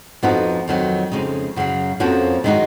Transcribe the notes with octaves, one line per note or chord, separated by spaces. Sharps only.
F2 F3 B3 D#4 F#4
F2 D#3 F#3
F2 C#3 G#3 D#4
F#2 C#3 F#3
F2 F3 A#3 C#4 F#4
D#3 G#3 D#4 F#4